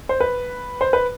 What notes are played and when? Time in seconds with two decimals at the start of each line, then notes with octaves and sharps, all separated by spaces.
0.09 C5
0.21 B4
0.81 C5
0.93 B4